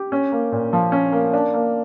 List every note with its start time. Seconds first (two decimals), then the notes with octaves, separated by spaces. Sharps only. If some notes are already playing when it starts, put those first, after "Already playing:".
Already playing: G4
0.12 C#4
0.32 A#3
0.52 A#2
0.73 F3
0.92 C#4
1.12 A#3
1.33 D4
1.54 A#3